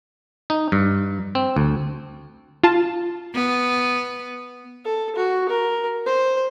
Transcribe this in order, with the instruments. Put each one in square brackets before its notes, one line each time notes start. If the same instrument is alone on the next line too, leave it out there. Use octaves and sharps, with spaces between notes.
[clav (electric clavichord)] D#4
G2
C4
D2
[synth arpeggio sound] F4 A5
[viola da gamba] B3
[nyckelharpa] A4
F#4
A#4
C5